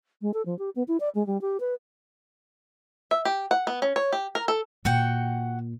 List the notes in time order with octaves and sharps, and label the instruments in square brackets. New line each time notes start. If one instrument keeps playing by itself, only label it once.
[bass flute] G#3
A4
F3
G4
B3
E4
D5
G#3
G3
G4
B4
[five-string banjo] E5
G4
F#5
B3
C#4
C#5
G4
A#4
A4
[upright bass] A#2 [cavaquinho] F#4 F#5 G5